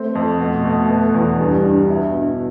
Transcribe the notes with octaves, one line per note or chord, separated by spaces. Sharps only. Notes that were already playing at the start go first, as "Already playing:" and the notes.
Already playing: A3 C4
F2
B2 A3
B2
B3
E2
G2 G3
G2
B2 E4
G2